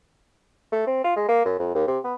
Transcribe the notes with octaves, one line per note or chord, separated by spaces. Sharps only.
A3
C4
F4
G#3
A#3
F#2
F2
D#2
C3
B3